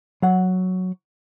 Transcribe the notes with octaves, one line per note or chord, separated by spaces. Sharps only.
F#3 F#5